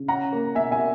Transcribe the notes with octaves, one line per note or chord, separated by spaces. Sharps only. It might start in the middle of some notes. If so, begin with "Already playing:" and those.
Already playing: C#3
C#4 F#5 A#5
A#3
B2 E5 G#5
E5 G#5
A#3